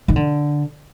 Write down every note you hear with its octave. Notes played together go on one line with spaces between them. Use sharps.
D#3
D3